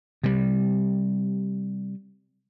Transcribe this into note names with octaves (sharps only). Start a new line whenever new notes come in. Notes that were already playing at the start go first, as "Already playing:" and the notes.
C3 G3